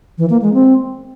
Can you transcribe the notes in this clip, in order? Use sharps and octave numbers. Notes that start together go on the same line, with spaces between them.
E3
A#3
G#3
C4